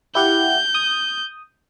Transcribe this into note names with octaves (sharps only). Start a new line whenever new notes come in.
E4 G4 F#5 G6
D#6